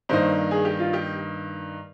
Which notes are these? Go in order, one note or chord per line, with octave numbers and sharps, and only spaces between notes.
G2 D#3 A#3 D#4 C5
G#4
G4
F4
G4